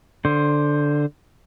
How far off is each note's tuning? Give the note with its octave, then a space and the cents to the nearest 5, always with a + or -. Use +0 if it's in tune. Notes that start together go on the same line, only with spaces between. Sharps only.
D3 +0 C5 +10